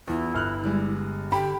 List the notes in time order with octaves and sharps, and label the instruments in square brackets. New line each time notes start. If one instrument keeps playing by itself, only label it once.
[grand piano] E2 [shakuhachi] E4 [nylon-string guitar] F4
[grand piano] G1 F6 F#6
[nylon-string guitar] D3 G3 G#3
[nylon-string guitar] D3 [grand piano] G4 [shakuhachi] G5 [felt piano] B5